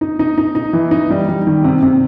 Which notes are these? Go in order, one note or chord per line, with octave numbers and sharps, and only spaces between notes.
D#4
D#4
D#4
D#4
E3
D#4
G3
G3
D#3
C3
C3